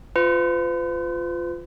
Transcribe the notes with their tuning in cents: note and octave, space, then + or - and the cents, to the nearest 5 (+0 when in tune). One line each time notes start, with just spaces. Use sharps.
F4 +0 B4 +45